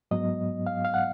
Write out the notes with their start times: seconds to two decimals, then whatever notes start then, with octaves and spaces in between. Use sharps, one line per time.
0.11 G#2 F#3 B3 D#5
0.67 F5
0.85 F5
0.94 F#5